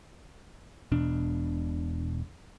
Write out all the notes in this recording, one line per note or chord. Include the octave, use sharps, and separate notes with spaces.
E1 B2 D4